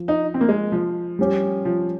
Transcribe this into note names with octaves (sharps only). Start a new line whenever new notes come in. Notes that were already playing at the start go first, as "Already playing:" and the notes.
Already playing: F3
D#4
C4
A#3
G#3
F3
G3 C#4 G4
F3